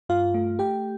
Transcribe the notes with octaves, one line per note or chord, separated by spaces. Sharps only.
G2 F4 F5
A3
A3 G4 G5